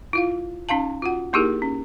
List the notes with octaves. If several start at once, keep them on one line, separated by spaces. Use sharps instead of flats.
E4 F4 F5
C#4 D#4 F5 A5
F4 F#4 F#5
A#3 D#4 E4 G4 G#4 A#4
C#4